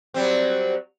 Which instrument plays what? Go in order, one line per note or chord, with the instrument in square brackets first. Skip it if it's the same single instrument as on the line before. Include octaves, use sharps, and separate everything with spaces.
[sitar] F#3 G3 C4